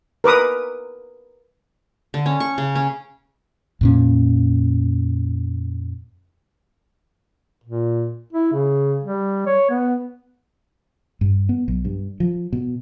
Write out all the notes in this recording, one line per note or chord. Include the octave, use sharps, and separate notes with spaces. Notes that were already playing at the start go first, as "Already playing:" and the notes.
A#4 B4 D6 D#6
D3
C#4
C#6
C#3
C#4
F2 A#2 C#4
A#2
E4
C#3
G3
C#5
B3
G2
B3
B1
G2
F3
B2